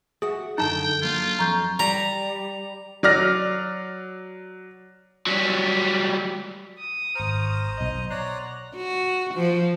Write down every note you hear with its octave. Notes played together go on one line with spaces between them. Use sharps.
F#4 G#4 E5 F#5
F#2 D3 D#4 G5 A5
F#3 A#3 D4 F4
F2 F#3 A#5 C#6 G6
G3 A#5
F#3 D5 F6 A#6
F#3 G3
D#6
G#1 C5 A#5 C#6 F6
B1 D#5 D#6
C#5 D5 F#5 A#5 C6 F#6
F#4
F3